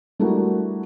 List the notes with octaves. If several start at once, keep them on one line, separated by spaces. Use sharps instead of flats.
G3 A3 D4 E4 F#4 A#4